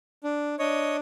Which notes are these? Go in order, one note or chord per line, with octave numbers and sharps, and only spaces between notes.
D4
D4 C#5 D#5